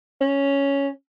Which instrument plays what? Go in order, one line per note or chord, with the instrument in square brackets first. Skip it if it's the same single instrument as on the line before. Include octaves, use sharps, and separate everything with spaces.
[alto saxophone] C#4